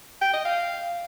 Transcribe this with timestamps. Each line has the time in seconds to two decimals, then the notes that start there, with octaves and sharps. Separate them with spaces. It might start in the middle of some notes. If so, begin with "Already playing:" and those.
0.22 G5
0.33 D#5
0.45 F5